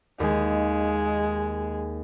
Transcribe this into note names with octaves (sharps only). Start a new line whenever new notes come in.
D#2 G#3